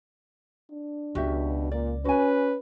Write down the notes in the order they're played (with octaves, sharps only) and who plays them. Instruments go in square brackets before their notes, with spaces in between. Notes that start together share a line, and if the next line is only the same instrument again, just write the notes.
[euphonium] D4
[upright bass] C#2 [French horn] B2 [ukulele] F#4 G4 E5
[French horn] A#2 [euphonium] A#3 [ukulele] D5
[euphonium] C#4 [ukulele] F#4 G#5 [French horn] B4